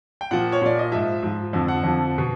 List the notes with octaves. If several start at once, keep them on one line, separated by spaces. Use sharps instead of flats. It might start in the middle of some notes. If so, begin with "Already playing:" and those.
G5
A#2 F3 F#5
C#5
A#2 F3 D5
D#5
G#2 F3 E5
G#2 F3
F2 D3 F3
F#5
F2 D3 F3
B2